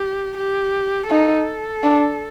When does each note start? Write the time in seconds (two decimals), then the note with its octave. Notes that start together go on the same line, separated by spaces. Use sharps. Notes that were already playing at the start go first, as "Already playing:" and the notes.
Already playing: G4
0.37 G4
1.09 D#4 A4
1.84 D4